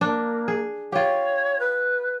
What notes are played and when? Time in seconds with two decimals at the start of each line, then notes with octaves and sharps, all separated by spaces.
0.01 A#3 D4
0.48 G#4
0.92 F4 G4 C#5
1.59 B4